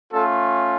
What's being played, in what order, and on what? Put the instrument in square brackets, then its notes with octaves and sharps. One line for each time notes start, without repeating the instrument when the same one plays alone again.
[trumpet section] A3 C#4 F4 A4